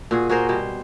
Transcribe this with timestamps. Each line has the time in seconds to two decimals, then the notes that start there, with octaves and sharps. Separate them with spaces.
0.11 A#2 F#4 G#4
0.29 F#4 G#4 A#4 C5
0.49 B2 G3 C5